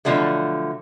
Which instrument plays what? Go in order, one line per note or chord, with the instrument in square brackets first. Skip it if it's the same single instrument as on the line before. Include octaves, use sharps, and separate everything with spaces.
[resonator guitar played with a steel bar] B2 D3 F3 F#3 A3